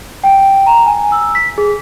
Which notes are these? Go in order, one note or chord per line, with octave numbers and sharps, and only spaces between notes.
G5
A#5
G#5
E6
B6
G#4